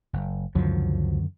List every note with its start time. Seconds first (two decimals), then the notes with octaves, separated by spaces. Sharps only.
0.13 F#1
0.55 C#2 F#2 D3 D#3 F3 F#3